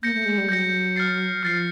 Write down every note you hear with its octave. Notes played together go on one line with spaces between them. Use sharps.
A#3 G6 A#6 C#7
A3
G#3
G3
F#3 G6 A#6 C#7
F6 A6 C7
F3 F6 A6 C7